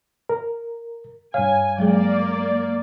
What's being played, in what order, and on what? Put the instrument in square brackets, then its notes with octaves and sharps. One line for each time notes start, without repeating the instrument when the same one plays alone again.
[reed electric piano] A#4
[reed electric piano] G2 F5 [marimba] C#5 [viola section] G#5
[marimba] F#3 G#3 G#4 [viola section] A#3 D5